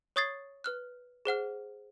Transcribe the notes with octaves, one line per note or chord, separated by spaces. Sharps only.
C#5 C#6 D#6 G#6 A6 C7
B4 F6 F#6
G#4 C5 F#5 F6